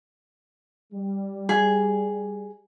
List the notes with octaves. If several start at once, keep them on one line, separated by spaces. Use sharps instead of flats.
G3
G#4